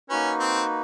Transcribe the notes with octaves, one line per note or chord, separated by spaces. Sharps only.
A#3 C#4 D#4 F#4 B4
C4